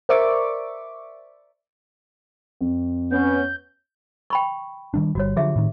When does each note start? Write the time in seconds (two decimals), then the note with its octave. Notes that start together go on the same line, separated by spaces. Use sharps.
0.09 A#4 C5 D5 E5 C#6 D6
2.61 F2
3.12 B3 C#4 G6
4.30 G5 B5 C#6
4.94 D#3 G3 D4
5.15 G1 G3 F#4 C#5
5.36 D3 F3 F#3 G4 G#4 E5
5.56 A2 D#3